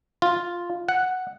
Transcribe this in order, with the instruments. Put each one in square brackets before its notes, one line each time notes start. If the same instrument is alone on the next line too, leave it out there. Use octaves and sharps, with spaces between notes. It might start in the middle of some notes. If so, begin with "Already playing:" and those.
[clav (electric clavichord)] F4
F#5